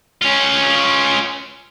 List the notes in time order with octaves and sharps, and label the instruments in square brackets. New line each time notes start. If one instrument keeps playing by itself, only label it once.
[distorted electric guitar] C#4 F4